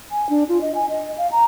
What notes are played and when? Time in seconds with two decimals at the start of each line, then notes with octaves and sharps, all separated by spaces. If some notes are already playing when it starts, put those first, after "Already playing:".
0.12 G#5
0.30 D4
0.49 F4
0.61 D#5
0.75 G#5
0.89 D#5
1.18 F5
1.32 A#5